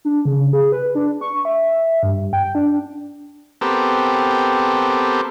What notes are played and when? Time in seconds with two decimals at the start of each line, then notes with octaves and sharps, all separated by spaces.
0.05 D4
0.25 C#3
0.53 G#4
0.72 B4
0.95 D4
1.21 C#6
1.45 E5
2.03 G2
2.33 G5
2.55 D4
3.61 B3 C4 G4 A4 A#4